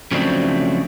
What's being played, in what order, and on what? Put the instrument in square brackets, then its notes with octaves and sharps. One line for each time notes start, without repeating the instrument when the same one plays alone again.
[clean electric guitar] C#3 F3 F#3 A3 C4 D4